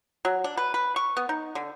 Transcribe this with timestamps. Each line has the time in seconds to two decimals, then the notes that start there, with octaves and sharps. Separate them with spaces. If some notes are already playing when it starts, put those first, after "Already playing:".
0.25 F#3
0.44 D4
0.57 B4
0.74 B4
0.96 C#6
1.17 B3
1.29 D#4
1.55 D3